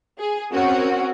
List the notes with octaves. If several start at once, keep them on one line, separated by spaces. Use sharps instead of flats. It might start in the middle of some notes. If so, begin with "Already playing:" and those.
G#4
C4 C#4 F#4 A#4